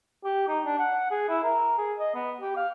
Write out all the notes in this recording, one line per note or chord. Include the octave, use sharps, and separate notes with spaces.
G4
D#4
D4
F#5
G#4
E4
A#4
G#4
D#5
B3
G4
F5